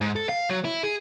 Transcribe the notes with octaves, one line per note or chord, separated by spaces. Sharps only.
G#2
A4
F5
F#3
E4
G#4